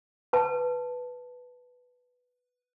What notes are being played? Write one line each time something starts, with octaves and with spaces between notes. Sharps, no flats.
B4 A5